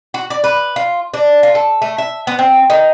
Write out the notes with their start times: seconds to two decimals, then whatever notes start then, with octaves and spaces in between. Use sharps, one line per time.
0.14 F#4
0.30 D5
0.44 B4
0.76 F4
1.14 D4
1.43 F4
1.55 A4
1.82 A3
1.98 E5
2.27 B3
2.39 C4
2.70 D#4